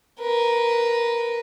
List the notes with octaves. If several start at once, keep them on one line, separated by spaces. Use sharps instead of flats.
A#4 B4